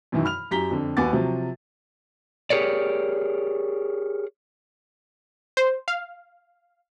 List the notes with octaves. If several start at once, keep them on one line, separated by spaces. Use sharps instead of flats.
F#2 B2 D#3 E3
B5 F6 F7
F#2 G4 A#5 B6 G7
F2 D3
D#2 B3 F#4 G#5 D6 A6
C3 F3 F#3
G4 G#4 A#4 C#5 D5
C5
F5